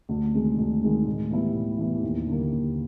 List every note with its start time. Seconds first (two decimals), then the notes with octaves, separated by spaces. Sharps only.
0.09 D2
0.34 C3 D#3 G#3
0.58 D2
0.81 C3 D#3 G#3
1.07 A2
1.31 E3 G3 B3 E4
1.55 A2
1.78 E3 G3 B3 E4
2.03 D#2
2.27 D3 G3 A#3
2.52 D#2